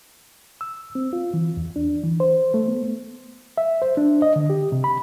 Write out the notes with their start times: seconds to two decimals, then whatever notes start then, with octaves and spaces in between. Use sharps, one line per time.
0.61 E6
0.95 C4
1.13 F4
1.34 E3
1.57 E2
1.76 D4
2.04 E3
2.20 C5
2.54 A3
2.68 B3
3.58 E5
3.82 C5
3.97 D4
4.22 D#5
4.36 D3
4.50 G4
4.72 C3
4.84 B5